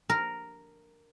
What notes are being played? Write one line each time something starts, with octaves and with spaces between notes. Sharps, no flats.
A#4